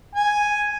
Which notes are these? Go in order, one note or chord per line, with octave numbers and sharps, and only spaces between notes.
G#5